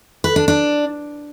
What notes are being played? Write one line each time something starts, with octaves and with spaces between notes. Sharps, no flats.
B4
D4
D4